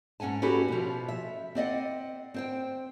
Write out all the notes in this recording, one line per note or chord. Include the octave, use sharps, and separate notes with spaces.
G#2 C#4 F#5 G#5 A5
C#4 D#4 F#4 G4 A4 B4
B2 F3
E5
C4 D5 D#5 F#5
C4 C5 G5